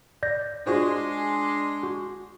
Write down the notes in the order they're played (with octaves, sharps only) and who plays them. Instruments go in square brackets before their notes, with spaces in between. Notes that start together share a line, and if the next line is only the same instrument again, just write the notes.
[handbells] D5 G6 A#6
[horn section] G#3 D4 C6 [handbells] F4 F#4 C5
[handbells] F#4